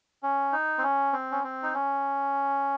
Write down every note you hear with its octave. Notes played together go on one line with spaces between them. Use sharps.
C#4
D#4
C4
C#4
C4
C#4
C4
D#4
C#4